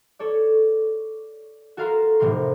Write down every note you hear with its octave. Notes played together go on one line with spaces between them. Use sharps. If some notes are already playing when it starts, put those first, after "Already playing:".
A4 C#5 D5
F#4 A4 A#4 F5 A#5 C6
F1 A2 C3 E3 A#4 C6